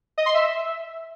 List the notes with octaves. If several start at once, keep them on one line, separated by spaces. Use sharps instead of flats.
D#5
C6
E5